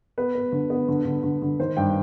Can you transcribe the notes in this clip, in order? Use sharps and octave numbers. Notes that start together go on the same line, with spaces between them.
B3 B4
B3
D3
B3
D3
D3
D3
D3
D#3 C5
G2 G5